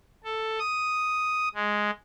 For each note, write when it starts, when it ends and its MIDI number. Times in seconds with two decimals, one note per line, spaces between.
0.24 0.59 69
0.59 1.49 87
1.55 1.91 56